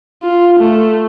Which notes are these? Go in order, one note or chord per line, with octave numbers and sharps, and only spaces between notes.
F4
A3